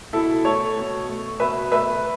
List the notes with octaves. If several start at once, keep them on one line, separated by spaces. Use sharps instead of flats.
B2 E4 A4
A3 A4 C#5
B2
A3
B2 B4 E5
A3 B4 E5